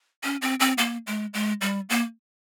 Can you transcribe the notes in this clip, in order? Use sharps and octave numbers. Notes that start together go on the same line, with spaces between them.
C#4
C4
C4
A#3
G#3
G#3
G3
A#3